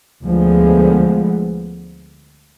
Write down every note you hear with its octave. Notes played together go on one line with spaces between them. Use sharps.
D2 D3 F3 G#3 B3